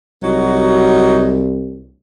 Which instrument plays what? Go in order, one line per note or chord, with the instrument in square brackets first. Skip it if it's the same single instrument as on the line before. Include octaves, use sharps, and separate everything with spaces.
[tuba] C2 [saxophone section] F#3 D#4 F#4